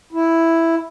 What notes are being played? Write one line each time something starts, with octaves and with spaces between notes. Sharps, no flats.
E4